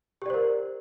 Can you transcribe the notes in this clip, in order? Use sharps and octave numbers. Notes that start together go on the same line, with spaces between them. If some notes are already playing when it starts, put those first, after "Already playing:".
G4 A#4 C5 D5